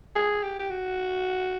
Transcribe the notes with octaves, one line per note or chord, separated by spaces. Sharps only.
G#4
G4
G4
F#4